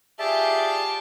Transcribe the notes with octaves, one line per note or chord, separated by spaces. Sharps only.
F4 G4 G#4 D5 E5 A5